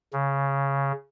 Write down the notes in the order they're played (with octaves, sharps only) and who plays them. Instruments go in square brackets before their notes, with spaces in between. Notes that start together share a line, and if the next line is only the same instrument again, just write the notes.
[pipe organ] C#3